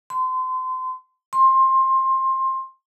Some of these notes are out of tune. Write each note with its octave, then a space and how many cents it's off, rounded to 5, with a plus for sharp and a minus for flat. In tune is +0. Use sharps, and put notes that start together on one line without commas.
C6 -30
C6 +20